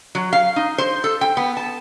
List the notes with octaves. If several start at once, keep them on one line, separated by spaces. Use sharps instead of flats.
F#3
F5
D#4
C5
A4
G5
B3
A5